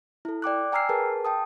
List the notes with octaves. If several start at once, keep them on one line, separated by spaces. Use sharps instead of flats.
E4 A4
D5 G5 D6 F#6
G5 G#5 A#5 E6 F6 C7
G#4 A#4 B4 A5
G5 A5 D#6